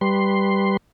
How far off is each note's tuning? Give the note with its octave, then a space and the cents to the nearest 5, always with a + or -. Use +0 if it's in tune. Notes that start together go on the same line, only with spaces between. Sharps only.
G3 +0 B4 +0 C6 +0